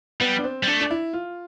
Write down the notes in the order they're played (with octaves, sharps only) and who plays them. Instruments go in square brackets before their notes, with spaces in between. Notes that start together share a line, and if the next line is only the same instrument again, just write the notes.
[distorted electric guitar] G3 [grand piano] B3
[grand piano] D4
C4
[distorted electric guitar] G3
[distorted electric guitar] A3 [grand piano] D4
[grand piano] D4
E4
F4